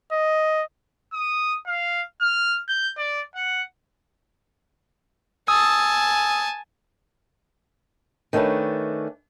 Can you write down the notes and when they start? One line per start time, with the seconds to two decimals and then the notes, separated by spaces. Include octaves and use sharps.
0.11 D#5
1.13 D#6
1.67 F5
2.21 F6
2.68 G6
2.97 D5
3.35 F#5
5.48 G#5 A5 D#6 E6
8.33 D#3 A3 C#4 D4 B4